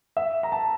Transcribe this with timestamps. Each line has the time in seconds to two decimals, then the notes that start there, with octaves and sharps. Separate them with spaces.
0.17 E5
0.43 A#5
0.52 A5